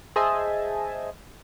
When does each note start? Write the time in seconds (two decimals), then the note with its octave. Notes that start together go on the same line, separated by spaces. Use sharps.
0.16 G#4 C5 D#5 E5 G#5 A5